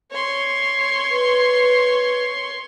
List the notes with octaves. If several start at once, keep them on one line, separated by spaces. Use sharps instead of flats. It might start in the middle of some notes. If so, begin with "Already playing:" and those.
C#5 C6
B4